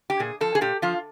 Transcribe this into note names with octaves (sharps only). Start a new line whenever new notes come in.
G4
A#2 G#4
F3 A4
G#4
A#2 G4
F3 F4